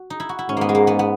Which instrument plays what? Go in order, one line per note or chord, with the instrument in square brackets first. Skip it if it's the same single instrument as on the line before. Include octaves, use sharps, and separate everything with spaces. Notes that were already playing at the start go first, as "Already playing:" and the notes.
Already playing: [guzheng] F#4
D#4
E4
F#4
E4
[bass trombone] G#2 [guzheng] C#4
[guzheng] A#3 B3
G#3
A#3
B3
B3